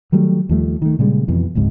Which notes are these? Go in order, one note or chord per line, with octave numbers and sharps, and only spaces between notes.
D#3 F#3 G3 A3
D#2 F3 G3 A3
D#3 A3
A#2 C#3 G3 G#3
F2 B2 E3
F1 C#2 G#2 C3